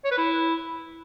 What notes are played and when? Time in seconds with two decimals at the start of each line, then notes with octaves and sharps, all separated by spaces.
0.05 C#5
0.11 B4
0.17 E4